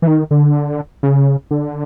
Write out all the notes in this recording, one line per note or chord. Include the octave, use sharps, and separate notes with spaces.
E3
D#3
D3
C#3
D3